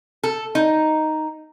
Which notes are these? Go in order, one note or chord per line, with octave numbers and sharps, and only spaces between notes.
A4
D#4